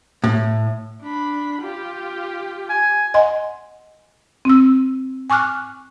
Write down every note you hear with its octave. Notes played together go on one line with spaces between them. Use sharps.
A2
D4 B5
F4 G4
G#5
D#5 F#5 G#5 C6
C4 E6
G#5 C#6 D6 F6 F#6